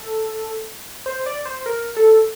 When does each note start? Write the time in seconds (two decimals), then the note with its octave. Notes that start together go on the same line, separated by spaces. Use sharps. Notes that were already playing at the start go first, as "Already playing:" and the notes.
Already playing: A4
1.06 C5
1.26 D5
1.45 C5
1.66 A#4
1.97 A4